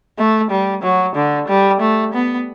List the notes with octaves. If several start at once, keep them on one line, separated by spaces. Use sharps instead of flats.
A3
G3
F#3
D3
G3
A3
B3